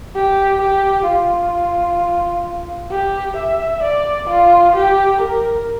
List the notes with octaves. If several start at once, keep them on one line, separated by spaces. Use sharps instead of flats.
G4
G4
F4
G4
E5
D5
F4
G4
A#4